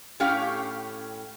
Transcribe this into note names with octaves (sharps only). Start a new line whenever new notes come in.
A2 C#4 G4 F5 G5